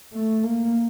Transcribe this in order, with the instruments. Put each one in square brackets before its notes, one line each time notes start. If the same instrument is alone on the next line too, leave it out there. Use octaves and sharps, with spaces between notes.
[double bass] A3
A#3